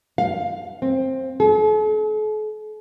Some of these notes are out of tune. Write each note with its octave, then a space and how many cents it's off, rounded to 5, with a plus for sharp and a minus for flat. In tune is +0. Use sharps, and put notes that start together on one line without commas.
F5 +10
C4 +15
A4 -45